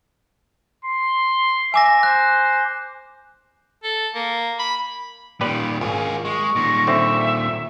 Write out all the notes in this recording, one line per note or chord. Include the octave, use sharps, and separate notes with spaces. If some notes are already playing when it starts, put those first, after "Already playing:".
C6
E5 G#5 D6 A#6
C5 F#6
A4
A#3
B5
A#2 D#3 G4 B4 D5
G#1 F4 G#4
G#3 C#6
A#2 D#3 A#6
D3 C4 E5